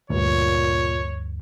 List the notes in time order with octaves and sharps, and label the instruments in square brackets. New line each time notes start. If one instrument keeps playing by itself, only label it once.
[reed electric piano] D2 G2 [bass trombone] A#2 [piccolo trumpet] C#5